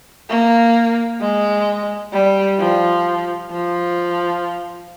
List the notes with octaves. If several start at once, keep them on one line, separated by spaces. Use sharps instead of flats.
A#3
G#3
G3
F3
F3